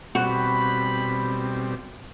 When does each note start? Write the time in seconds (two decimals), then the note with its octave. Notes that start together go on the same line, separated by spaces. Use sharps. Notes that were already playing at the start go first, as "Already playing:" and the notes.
0.15 B2 G3 C4 F#4 B5